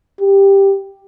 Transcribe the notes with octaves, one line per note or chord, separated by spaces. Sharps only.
G4